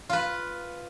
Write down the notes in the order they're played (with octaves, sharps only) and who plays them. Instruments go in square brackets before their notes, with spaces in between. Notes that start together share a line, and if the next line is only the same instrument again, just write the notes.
[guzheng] F4 B4